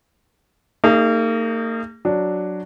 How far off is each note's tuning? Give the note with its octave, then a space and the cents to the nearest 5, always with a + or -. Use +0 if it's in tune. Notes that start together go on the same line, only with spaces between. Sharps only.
A#3 -40 D#4 +0 G#4 -25
F#3 +0 D4 +0